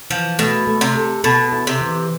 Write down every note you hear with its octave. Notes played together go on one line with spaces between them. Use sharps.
E3 F3
B2 A3
A3
C3
A4
B2 A4
E4
C3
E3